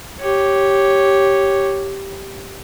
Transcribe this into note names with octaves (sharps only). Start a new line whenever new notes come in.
G4 C#5